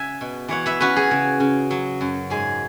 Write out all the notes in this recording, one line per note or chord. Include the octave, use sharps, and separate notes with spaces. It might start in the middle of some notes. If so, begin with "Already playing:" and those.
Already playing: C#3 E5 F#5 G#5
B2
E3 C#5 F#5
B4 E5
C#4 F#4 B4
G#4
C#3
C#3
F#3
F#2
G#2 G#4